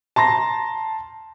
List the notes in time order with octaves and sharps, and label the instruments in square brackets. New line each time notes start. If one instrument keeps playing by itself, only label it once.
[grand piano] A5 A#5 C6 A#6